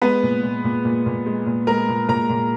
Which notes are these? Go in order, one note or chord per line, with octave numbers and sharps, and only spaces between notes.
G#3 B3 B4
A#2
A#2
A#2
A#2
A#2
G#3
A#2
G#3 A#4 A#5
A#2
A#2 A#4 A#5
A#2